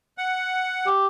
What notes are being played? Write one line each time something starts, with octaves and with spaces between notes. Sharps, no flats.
F#5
G4